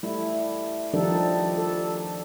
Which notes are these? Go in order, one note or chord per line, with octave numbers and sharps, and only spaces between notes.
G3 A3 E4
D#3 F3 G3 D4 D#4 A4
A4